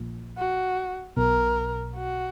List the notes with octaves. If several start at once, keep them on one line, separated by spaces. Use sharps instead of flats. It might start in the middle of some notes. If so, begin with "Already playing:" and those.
Already playing: A#1 A#2
F#4
B1 B2 A#4
F#4